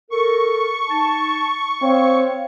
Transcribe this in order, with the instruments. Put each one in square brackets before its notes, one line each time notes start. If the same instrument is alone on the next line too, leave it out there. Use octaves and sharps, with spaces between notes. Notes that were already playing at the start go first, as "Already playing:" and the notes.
[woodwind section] A4 A#4 [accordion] C#6
[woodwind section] D#4 A5
[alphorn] C4 [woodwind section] C#5 F5